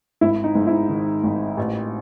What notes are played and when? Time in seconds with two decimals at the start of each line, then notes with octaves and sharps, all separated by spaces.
0.21 G#1 E4
0.44 D#4
0.55 G#2
0.67 E4
0.89 D#3
1.23 G#1
1.57 A1